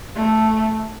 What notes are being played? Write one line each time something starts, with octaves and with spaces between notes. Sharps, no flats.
A3